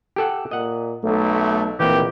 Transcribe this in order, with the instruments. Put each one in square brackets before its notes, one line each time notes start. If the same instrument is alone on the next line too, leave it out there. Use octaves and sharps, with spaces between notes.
[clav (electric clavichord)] G4 A4 F#5
[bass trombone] A#2 [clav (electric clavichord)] D#5 F#5
[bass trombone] B1 [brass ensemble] A3
[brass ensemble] A#1 B2 [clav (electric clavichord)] E3 A#3 C4 [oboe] G4